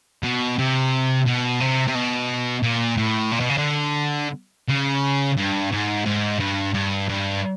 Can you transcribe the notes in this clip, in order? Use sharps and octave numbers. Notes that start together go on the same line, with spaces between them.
B2
C3
B2
C3
C3
B2
A#2
A2
A#2
B2
C#3
D3
C#3
G2
G#2
G#2
G2
G2
G2